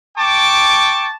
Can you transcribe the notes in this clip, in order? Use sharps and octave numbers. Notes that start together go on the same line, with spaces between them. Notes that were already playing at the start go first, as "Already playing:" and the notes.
G5 A5 C#6 D6